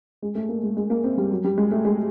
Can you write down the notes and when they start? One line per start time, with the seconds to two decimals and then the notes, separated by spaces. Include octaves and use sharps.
0.22 G#3
0.35 A3
0.49 A#3
0.63 G#3
0.77 G#3
0.90 A#3
1.04 C4
1.17 G3
1.31 F#3
1.44 G3
1.58 G#3
1.71 A3
1.85 G#3